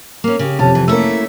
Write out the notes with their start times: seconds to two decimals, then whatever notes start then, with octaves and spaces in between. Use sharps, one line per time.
0.24 A#3 C#4
0.39 C#3 G4
0.59 F2 C3 C#4 A5
0.75 E3
0.88 A3 A#3 C#4 E4 E6